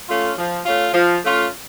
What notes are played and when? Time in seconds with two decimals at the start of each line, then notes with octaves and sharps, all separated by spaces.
0.08 A3 C#4 F4
0.37 F3
0.66 A3 C#4 F4
0.94 F3
1.23 A3 C#4 F4